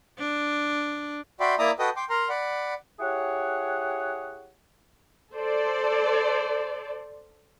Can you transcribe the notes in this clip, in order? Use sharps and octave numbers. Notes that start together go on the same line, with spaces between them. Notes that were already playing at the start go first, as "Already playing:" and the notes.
D4
F#4 D5 E5 G5 B5 C6
A#3 E4 D5 E5 A#5 D#6
F#4 A4 B4 D#5 G5 D#6
G5 C6 D6
A#4 A#5 C6
D5 F#5 B5
E4 G4 G#4 C#5 F#5
A4 C5 D5